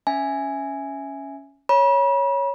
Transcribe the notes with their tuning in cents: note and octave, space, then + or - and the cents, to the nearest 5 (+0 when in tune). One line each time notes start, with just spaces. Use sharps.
C#4 +5 E5 +0 G#5 +0
C#5 +0 B5 -40